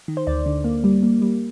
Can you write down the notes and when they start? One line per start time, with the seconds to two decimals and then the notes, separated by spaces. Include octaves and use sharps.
0.08 D#3
0.17 C5
0.27 D2 D5
0.46 D3
0.64 A#3
0.84 G3
1.03 A#3
1.22 G3